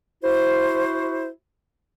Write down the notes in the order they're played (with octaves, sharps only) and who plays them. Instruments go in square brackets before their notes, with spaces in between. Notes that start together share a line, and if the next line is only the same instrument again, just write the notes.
[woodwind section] E4 F#4 C5